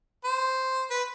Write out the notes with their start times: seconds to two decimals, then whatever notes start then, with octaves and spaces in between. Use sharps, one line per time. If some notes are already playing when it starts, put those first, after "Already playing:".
0.24 C5
0.90 B4